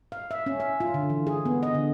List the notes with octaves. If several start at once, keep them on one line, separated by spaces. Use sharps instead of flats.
F5
E5
C#4
E5
F4
D3
E3
G#4
B3
D#5
D3